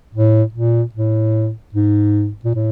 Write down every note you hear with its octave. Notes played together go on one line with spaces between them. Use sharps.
A2
A#2
A2
G#2
A#2
A2